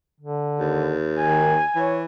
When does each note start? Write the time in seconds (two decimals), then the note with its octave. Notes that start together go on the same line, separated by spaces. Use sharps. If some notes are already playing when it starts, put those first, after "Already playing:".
0.20 D3
0.60 D#2
1.20 D#3 G#5
1.76 E3 C#5